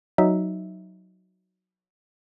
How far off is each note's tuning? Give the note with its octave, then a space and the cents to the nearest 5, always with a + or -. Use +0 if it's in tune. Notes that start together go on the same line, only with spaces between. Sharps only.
F#3 +0 D#4 +0 E5 -10